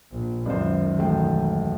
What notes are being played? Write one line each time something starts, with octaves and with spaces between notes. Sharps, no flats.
A#1
C#2 F#2 D#3 C5 D5
E1 A3 G5